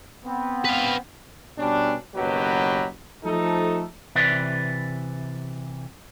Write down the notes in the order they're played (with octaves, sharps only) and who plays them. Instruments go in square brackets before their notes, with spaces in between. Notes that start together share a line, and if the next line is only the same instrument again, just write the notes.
[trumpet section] B3 C4
[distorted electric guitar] B4 F5
[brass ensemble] B2 G3 C#4 D4
F#1 B2 D#3 F#3 G4 B4
F3 A3 D#4 A4
[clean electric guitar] C3 E3 B4 D5